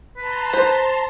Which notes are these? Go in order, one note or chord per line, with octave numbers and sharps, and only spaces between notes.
B4 A5 A#5 C6
C5